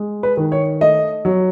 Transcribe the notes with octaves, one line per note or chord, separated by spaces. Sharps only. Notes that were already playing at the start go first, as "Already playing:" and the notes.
Already playing: G#3
B4
D#3
C#5
A3 D#5
F#3